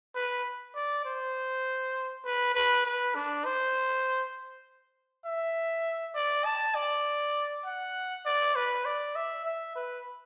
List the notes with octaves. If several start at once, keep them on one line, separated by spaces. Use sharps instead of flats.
B4
D5
C5
B4
B4
B4
D4
C5
E5
D5
A5
D5
F#5
D5
B4
D5
E5
E5
B4